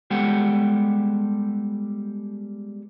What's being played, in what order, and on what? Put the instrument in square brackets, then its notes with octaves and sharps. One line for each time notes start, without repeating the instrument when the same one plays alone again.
[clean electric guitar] G3 G#3 B3 G4 A4 F#5